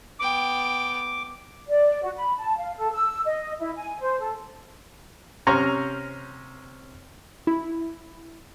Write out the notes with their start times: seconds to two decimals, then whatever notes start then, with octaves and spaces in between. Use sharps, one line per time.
0.20 B3 G5 D6
1.68 D5
2.03 F#4
2.16 B5
2.37 A5
2.57 F5
2.78 A4
2.93 E6
3.25 D#5
3.60 E4
3.76 G#5
4.01 C5
4.20 A4
5.47 C3 C#4 C5 A#5 C#6 F6
7.47 E4